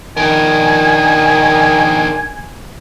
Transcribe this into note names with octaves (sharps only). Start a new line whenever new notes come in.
D#3 D4 A#4 G#5